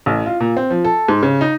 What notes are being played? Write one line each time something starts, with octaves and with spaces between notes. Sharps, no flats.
A1
F4
A#2
C4
F3
A4
G#2
C#3
D#4